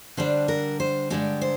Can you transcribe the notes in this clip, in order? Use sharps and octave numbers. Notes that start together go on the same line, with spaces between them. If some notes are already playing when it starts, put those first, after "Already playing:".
D3 G3 D4 C5
A#4
C5
G2 D3 G#3 D4 G4
C5